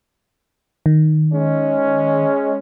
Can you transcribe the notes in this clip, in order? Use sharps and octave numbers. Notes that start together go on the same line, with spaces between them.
D#3
G#3 C#4